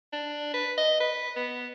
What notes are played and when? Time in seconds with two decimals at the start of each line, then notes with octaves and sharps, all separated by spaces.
0.13 D4
0.54 B4
0.78 D#5
1.00 B4
1.37 B3